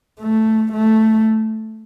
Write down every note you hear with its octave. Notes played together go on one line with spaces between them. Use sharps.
A3
A3